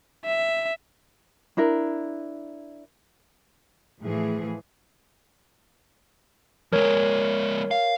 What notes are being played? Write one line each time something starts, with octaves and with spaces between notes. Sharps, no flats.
E5
D4 E4 A#4
A2 E3 F3 G#4
F3 G#3 A#4 C#5
F5